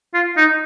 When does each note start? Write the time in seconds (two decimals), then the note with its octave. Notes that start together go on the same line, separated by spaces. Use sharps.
0.14 F4
0.37 D#4